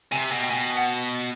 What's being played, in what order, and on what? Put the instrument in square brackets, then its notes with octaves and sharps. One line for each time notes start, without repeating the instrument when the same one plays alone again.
[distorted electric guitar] C3 [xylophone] G#5
[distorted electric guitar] B2
[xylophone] G5
[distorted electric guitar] B2 [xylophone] G#5
[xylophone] F#5